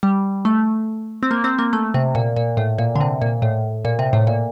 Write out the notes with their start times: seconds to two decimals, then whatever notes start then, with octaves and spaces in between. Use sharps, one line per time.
0.03 G3
0.45 A3
1.23 C4
1.31 A#3
1.44 C4
1.59 A#3
1.73 A3
1.94 C3
2.15 A#2
2.36 A#2
2.57 A2
2.78 A#2
2.95 D3
3.01 C3
3.22 A#2
3.42 A2
3.85 A#2
3.99 C3
4.13 A2
4.27 A#2